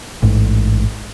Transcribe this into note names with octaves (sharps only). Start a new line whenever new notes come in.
A1 G#2